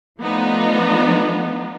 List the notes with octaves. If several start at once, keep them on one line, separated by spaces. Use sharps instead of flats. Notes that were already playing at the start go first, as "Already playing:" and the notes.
F3 A3 B3 D4 D#4 F4